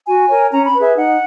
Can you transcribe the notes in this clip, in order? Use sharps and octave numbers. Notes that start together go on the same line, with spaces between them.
F#4 G#5
A#4 C#5
C#4 A#5
B5
B4
G#4 E5
D#4 F#5